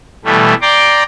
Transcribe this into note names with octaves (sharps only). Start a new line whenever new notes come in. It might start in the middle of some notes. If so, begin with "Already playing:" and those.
B2 E3 G3 A3
D5 G5 A#5 C6 D6